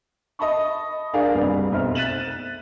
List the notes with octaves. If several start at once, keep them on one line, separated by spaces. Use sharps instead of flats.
D#5 E5 A5 B5 C#6
D4 G#4 A#4 D5 F5
F#1 C2 G3 B4
F1 B1 C5 E5 F6
F#6 A6 B6 D#7 E7 F#7